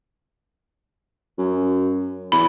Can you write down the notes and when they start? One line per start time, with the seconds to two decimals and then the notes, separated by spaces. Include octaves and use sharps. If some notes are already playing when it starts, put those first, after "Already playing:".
1.38 F#2
2.32 E2 B5